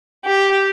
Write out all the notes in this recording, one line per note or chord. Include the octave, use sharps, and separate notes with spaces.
G4